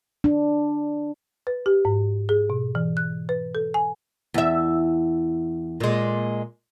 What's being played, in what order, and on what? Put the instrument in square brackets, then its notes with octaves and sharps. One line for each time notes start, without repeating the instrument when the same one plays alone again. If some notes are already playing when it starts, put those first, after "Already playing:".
[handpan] D4
[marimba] B4
G4
G#2
G#4
B2
E3
F#6
B4
A4
G#5
[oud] E2 E5
A#2 G#3